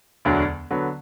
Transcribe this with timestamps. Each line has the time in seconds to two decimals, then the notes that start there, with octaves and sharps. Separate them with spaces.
0.25 E1 D2 D3 F#3
0.71 D3 F#3 B3